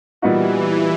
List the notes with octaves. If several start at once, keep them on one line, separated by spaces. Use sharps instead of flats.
A#2 E3 G3 B3 D#4 F#4